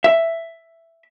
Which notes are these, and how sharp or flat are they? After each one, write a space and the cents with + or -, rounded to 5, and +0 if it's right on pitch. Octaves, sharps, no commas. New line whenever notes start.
E5 +5